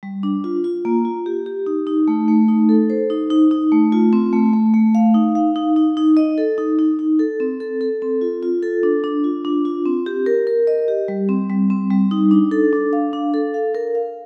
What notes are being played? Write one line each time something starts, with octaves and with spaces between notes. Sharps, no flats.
G3
D4
F4
F4
A#3
F4
G4
G4
D#4
D#4
A3
A3
D#4
A4
C5
D#4
D#4
D#4
A3
F4
C4
A3
A3
A3
F5
D#4
F5
D#4
D#4
D#4
D#5
A4
D#4
D#4
D#4
A4
C4
A4
A4
C4
F4
F4
A4
D4
D4
F4
D4
F4
C4
G4
A#4
A#4
D#5
G4
G3
C4
G3
C4
G3
D#4
D4
A4
D4
F5
D4
A4
F5
A#4
F5